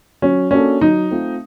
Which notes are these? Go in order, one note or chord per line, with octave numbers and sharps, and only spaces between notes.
F#3 C#4
A#3 C#4 D4 F#4 A4
F#3 D#4
A3 C4 F4